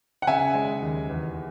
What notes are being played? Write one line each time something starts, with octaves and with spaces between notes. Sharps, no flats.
F#5
C#3 E5 G#5
G#3
D#2
E2